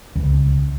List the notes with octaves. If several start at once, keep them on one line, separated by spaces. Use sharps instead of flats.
C#2